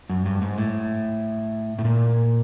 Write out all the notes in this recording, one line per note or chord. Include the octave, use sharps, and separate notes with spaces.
F#2
G2
G#2
A2
A2
A#2